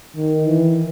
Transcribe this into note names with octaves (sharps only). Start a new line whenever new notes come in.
D#3
E3